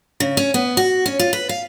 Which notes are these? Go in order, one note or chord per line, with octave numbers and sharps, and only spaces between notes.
C#3
C#4
B3
F#4
C#4
F4
B4
F5